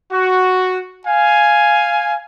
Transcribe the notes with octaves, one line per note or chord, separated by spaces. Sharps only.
F#4
F5 G#5